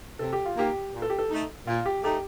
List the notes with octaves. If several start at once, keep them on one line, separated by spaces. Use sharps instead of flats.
C3 A4
G4
F4
D#3 A#3 G4
A#2
A4
G4
A4
A3 D#4
A#2 F4
G4
A3 D#4 G4